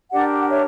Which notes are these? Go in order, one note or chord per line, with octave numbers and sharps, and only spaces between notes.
D4 G4 A#4 D5 F#5
F#5
C#5 E5